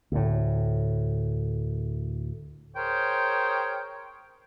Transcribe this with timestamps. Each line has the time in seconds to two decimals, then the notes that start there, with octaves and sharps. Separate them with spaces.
0.12 D2 A2
2.77 G#4 A#4 C5 C#5 G5